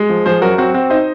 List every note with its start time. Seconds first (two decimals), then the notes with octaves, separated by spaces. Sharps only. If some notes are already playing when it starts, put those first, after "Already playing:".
Already playing: G#3
0.09 F3
0.26 F3 G#4 C5
0.42 F#2 F#4 A#4
0.58 C4 F#4
0.74 C4 F#4
0.90 D#4 C5 D#5